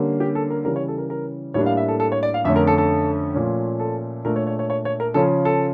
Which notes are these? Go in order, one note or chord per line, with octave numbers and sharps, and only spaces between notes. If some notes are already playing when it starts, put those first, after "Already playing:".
Already playing: D3 G3 A#3 C#4
G4
A4
A#4
C#3 E3 G3 C#4 A#4
C#5
A4
A#4
A#4
A2 G3 A#3 D4 C#5
F5
E5
A4
A4
C#5
D5
F5
F2 D3 A3 C#4 E5
A#4
A4
A4
A#2 F3 A3 C#4
A4
A#2 A3 D4 A#4
C#5
C#5
C#5
C#5
C#5
A#4
C#3 F3 C#4 A4
A4